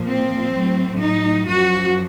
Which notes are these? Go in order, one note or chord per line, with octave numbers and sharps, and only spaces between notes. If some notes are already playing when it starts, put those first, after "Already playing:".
Already playing: A#2 F3
C4
A2 F#3
D#4
F#2 F3 F#4